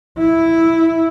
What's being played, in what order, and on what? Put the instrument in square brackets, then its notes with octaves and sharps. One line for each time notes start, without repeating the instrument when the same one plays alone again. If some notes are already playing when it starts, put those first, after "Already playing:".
[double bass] E4